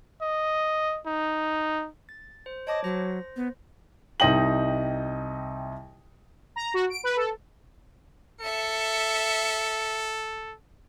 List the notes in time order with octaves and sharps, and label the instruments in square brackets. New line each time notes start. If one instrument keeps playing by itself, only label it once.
[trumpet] D#5
D#4
[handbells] A6
C5
[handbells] C#5 A5 D6 [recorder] D#5
[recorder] F#3 [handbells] C5 A#6
[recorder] B3
[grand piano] C2 D#4 D#5 G5 F#7
[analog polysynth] A#5
F#4
D7
B4
A4
[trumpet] A4 [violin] E5 C#7